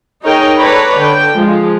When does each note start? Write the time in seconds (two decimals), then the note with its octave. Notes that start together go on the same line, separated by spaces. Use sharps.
0.23 D#4 G#4 A#4 C#5 D#5 G5
0.58 A4 B4 C#5 D5 A#5 B5
0.97 D3 G5
1.34 F3 G#3